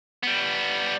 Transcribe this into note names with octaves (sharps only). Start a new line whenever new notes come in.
G3 B3